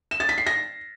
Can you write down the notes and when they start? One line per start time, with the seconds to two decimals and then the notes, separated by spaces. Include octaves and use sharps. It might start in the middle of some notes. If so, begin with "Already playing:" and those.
0.11 E7
0.20 A6
0.29 B6
0.38 C7
0.46 A#6